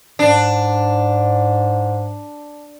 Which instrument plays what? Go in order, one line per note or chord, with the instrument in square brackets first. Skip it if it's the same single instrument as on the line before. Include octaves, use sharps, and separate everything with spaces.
[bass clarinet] G#2 [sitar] D4